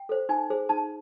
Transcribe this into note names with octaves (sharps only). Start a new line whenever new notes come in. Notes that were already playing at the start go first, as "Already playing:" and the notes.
Already playing: G5
A4 C5
D#4 G#5
G#4 C5
D#4 A5